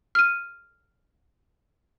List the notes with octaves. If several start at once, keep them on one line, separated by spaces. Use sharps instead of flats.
F6 D#7